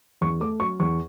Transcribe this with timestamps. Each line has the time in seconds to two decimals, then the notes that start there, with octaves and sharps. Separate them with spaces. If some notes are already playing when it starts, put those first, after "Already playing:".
0.21 E2 C#6
0.41 A3 D6
0.60 F#3 C#6
0.80 E2 C#6